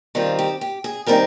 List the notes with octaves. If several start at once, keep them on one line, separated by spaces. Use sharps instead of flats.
D#3 G3 C4 D#4 F4
G4
G4
G#4
D#3 G3 C4 D#4 A#4